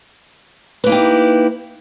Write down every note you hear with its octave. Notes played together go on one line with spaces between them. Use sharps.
A#3 D#4 E4 G4 B4